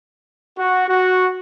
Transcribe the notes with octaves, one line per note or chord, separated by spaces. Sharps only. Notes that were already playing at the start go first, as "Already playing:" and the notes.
F#4
F#4